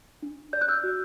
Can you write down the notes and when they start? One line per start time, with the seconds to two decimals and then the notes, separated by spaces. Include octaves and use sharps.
0.22 D4
0.53 D5 G6
0.61 F#6
0.68 E6 G6
0.83 F#4